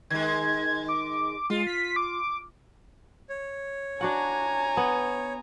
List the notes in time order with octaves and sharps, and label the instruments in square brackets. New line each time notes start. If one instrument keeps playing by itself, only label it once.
[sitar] D#3 G#3 [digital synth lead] G#6
[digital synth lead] D6
[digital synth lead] G#3 [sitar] F4
[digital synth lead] B6
D6
[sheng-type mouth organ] C#5
[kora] D4 F#4 F#5 [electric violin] G#5 A#5
[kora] B3